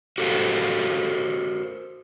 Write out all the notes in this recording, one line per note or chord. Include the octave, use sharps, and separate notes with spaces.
F#4 G4 A4 A#4 C5 F5